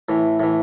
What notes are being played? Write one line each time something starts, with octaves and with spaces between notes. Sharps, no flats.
A2 E3
A2 E3